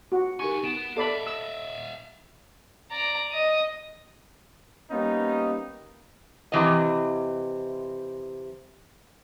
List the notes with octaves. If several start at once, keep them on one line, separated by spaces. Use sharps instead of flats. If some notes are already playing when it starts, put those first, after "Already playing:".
F#4
C2 D#4 G4 A#4 G#5 C#6
B3 D7 E7
A4 D5 E5 F5 B5
E6
D5 A#5
D#5 D#6
G3 A#3 B3 C#4 D#4
C3 E3 D#5